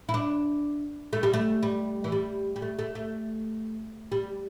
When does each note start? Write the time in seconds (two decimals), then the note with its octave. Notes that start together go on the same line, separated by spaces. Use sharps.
0.09 E4
0.14 D4
1.13 A3
1.23 G3
1.34 A3
1.63 G3
2.04 E3
2.12 G3
2.56 G3
2.62 A3
2.79 A3
2.95 A3
4.12 G3